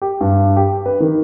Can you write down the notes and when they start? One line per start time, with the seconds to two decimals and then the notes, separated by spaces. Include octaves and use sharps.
0.02 G4
0.21 G2
0.56 G4
0.86 B4
1.00 D#3